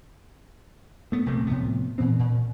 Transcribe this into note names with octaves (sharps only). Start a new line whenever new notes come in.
A3 B3
A#1 C3 A3 A#3
A2 C3 F3 B3
A#2 E3 B3 C4
A#2